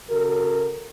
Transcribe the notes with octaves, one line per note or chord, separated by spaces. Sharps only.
C#3 F#4 A4 A#4